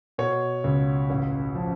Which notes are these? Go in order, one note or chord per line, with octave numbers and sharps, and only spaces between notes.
B2 C#5
C#2
A1
F3